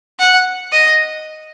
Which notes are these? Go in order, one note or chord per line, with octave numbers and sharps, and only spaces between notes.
F#5
D#5